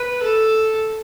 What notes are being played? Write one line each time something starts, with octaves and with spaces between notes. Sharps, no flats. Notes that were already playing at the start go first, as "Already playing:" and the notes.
Already playing: B4
A4